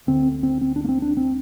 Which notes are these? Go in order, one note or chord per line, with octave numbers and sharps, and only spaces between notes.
D2 D3 C4
C4
C4
D4
A#3
C4
D4
C4